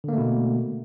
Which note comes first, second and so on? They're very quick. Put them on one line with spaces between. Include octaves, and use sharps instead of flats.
D3 A#3 A3 B2